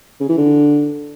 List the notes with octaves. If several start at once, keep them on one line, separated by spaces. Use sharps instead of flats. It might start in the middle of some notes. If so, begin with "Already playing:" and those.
C#3
E3
D3